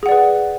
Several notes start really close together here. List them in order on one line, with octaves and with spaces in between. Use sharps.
G#4 F#5 D5 B4